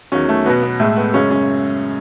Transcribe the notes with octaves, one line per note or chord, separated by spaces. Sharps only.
E2 D#3 F#3 C#4
A3
B2 F#3 B3
B3
A2 G#3 A3
B3
F#2 C#3 G#3 C#4
C#4